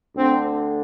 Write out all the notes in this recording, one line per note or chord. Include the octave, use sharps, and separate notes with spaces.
D2 D3 C4